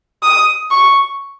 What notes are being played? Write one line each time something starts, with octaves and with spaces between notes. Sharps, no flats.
D#6
C#6